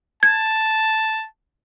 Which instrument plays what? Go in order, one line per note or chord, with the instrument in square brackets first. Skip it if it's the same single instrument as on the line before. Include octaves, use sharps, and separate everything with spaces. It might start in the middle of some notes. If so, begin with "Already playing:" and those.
[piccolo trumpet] A5 [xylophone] G#6